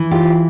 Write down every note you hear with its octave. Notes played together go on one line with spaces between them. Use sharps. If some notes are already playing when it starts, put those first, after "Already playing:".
Already playing: E3
F4 G4